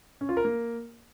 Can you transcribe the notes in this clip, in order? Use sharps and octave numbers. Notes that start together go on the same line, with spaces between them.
C#4
F4
A#4
A#3